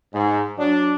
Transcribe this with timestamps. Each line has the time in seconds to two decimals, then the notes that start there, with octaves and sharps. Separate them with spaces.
0.14 G#2
0.57 F#3 D4